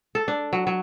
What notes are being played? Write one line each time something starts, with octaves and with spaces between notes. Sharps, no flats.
A4
D4
F#3
F#3